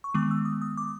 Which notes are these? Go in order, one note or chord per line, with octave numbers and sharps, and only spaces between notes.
C#6
D#3 G#3 B3 D6
E6
D#6
D#6
D6